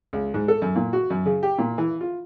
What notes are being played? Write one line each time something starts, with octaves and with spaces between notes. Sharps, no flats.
C#2
G#2
A4
F#2
A#2
F#4
F#2
C#3
G4
A#2
E3
F4